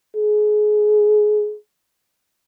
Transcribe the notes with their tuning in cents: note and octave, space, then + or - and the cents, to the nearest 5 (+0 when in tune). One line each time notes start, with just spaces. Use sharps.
G#4 +25